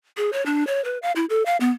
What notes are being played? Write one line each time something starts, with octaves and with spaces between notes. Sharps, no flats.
G#4
C#5
D4
C#5
B4
F5
E4
A4
F5
B3